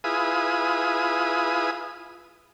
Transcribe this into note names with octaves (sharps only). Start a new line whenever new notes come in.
E4 F4 G#4 B4 D#6